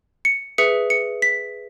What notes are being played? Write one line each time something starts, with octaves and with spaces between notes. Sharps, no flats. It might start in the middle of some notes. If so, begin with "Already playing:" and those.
C#7
G#4 B4 E5 C#7
C#7
B6